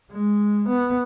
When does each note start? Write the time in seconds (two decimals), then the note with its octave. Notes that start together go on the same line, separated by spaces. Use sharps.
0.12 G#3
0.68 B3